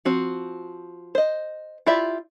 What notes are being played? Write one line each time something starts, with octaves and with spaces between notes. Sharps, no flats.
F3 C4 F#4
C5 D#5
E4 F4 G4 D5 E5